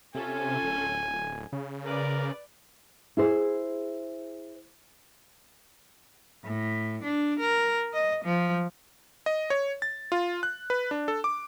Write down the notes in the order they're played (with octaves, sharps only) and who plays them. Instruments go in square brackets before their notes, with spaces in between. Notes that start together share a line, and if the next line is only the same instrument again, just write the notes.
[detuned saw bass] C3 [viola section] C#4 F4 A4 [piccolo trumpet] G#5
[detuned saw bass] D1
C#3
[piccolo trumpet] A#4 [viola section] B4 D5
[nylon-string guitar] E4 G#4 C5
[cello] A2
D4
A#4
D#5
F3
[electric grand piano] D#5
C#5
A6
F4
F#6
B4
D4
A4
D6